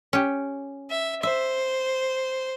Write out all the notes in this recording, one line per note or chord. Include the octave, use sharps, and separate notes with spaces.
C#4 G4
E5
C5 E5